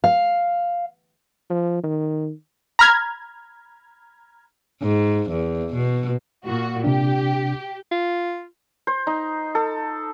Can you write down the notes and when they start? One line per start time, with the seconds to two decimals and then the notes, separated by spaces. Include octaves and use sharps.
0.04 F5
1.50 F3
1.84 D#3
2.79 A#5 B5 F6 G#6
4.82 G#2
5.31 E2
5.74 B2
6.45 A#2 F#4
6.84 C3 D4 G4
7.92 F4
8.87 C5
9.07 D#4
9.55 A4